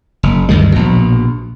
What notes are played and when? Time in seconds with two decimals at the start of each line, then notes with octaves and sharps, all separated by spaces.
0.23 F#1
0.49 D2 G2 D#3 G#3
0.72 A#1 B2